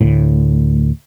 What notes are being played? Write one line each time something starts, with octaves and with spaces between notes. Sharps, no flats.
D2 A2